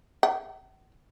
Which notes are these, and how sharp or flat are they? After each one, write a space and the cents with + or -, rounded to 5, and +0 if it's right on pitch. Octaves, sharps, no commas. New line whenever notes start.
F#5 +45